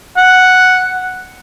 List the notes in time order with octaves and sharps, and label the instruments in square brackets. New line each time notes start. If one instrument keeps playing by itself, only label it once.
[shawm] F#5